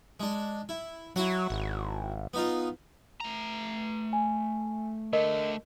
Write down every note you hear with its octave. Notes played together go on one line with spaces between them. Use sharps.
G#3 D4
E4
F#3 E4 F#4 F#5
G#1
B3 D#4 F4
A3 A#5
G#5
D3 A3 A#4 D#5